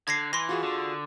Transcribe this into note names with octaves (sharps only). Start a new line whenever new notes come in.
D3 G#6 A#6 C7
E3 C6 A#6
F4 F#4 G#4
D3